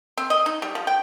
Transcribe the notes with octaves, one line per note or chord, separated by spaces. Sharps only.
C4
D#5
D#4
G3
F3
G5